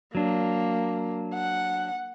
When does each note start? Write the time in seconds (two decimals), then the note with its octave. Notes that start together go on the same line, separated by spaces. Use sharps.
0.15 F#3 A#3 D4
1.34 F#5